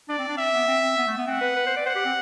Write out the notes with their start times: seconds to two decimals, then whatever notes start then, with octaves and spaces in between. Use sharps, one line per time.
0.09 D4 D5
0.19 C4
0.28 D4
0.38 C4 E5
0.54 B3
0.68 C4
0.83 C4
0.98 B3
1.07 A3
1.18 B3
1.27 C4 F#5
1.41 B4
1.56 B4
1.67 C5
1.77 D5
1.86 C5 F#5
1.95 G4
2.05 C4